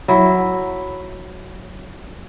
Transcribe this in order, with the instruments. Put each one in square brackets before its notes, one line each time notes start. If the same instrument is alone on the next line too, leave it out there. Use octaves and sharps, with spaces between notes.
[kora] F#3 E4